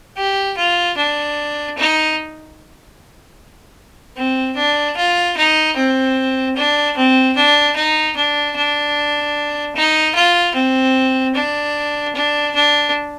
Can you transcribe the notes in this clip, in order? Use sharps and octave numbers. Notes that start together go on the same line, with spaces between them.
G4
F4
D4
D#4
C4
D4
F4
D#4
C4
D4
C4
D4
D#4
D4
D4
D#4
F4
C4
D4
D4
D4